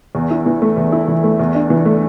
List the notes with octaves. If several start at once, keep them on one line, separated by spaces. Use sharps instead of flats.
E2
E4
E3
A3
E2
E4
E3
A3
E2
D4
E3
A3